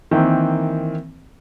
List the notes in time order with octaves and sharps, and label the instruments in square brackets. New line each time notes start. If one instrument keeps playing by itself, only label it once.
[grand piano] D#3 E3 A#3 C4